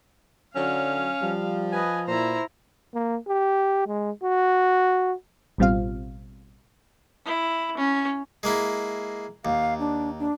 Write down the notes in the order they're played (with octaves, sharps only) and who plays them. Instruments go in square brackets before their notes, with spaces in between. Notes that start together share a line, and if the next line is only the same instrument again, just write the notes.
[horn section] D3 F#3 [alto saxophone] C#4 [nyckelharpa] F5
[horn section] F3 [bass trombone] G3
[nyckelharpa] B4 D#5 [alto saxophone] G#5
[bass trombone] A#2 [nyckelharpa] E4 A#5 [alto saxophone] C5
[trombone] A#3
G4
G#3
F#4
[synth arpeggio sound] A1 B2 G3 C4 F4 F5
[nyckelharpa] E4
C#4
[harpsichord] G#3 A#3 E4
[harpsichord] D#2 [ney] F5
[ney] D4
D4